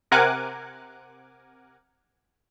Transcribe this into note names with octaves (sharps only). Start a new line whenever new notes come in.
C3 A#4 F#5 G#5 D6 F#6